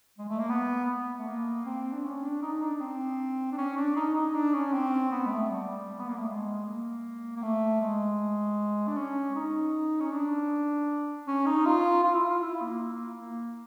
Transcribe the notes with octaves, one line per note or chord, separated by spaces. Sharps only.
G#3
A3
A#3
B3
A3
A#3
C4
D4
C#4
D4
D#4
D4
C4
D4
C#4
D4
D#4
D#4
D4
C#4
C4
B3
G#3
A3
G3
B3
A#3
A3
G#3
A#3
A#3
A3
G#3
D4
C#4
D#4
C#4
D4
C#4
D#4
F4
F4
E4
F4
E4
A#3
A#3